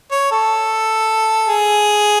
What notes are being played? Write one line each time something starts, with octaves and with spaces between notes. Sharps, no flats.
C#5
A4
G#4